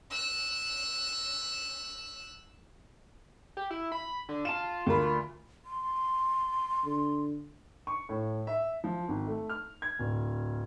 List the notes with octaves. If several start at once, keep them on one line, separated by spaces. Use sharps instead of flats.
E6 F#6
G4
E4
B5
D3
F4 A5 E7
D2 F4 A#4 B5
C6
D3
C#6
A2
E5
F3
G#1
A3
F6
G#6
D1